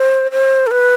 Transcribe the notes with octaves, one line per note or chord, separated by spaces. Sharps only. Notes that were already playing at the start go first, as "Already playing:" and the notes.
Already playing: C5
C5
A4
B4